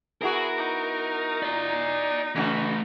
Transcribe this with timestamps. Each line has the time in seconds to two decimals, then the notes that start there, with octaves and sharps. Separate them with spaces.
0.22 B3 E4 F#4 G#4 A#4
0.57 D#4
1.43 D5 A#5
2.36 C#3 E3 A3 F#4 B4